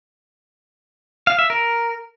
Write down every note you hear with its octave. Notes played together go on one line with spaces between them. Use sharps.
F5
E5
A#4